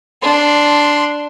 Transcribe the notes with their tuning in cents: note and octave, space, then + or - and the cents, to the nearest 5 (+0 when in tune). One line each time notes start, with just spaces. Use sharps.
D4 +0 C6 +0